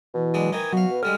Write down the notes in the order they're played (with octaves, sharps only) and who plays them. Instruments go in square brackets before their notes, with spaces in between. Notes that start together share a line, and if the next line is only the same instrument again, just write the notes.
[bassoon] B2 [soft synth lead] E3
[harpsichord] F#3 G#3 D4
[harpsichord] D#3 E3 D#4 [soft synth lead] G#6
[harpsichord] B2 F5 [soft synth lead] F#3 [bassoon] F#4
[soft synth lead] B4
[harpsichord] D3 G3 G#3 [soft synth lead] F6